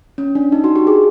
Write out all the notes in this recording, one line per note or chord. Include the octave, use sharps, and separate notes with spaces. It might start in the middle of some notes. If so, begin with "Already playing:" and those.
C#4
D4
D#4
F#4
G4
G#4